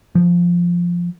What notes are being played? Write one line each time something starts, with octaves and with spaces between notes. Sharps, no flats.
F3